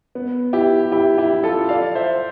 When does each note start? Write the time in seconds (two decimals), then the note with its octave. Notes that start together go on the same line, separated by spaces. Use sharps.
0.15 B3
0.53 E4 G4
0.92 E4 G4
1.18 E4 G4
1.43 F4 A4
1.69 D5 F5
1.95 C5 E5